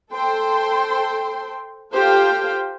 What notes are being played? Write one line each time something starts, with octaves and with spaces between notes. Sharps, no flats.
A4 C5 G5 C6
F4 G4 A4 C5 F5 G5